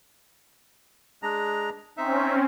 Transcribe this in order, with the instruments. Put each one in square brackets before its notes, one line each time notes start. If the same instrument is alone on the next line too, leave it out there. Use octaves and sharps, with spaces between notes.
[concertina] G#3 D4 A#5
[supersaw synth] C4 C#4 [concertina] D#4 E5